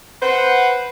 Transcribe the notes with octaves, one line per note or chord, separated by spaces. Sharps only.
B4 C5 F#5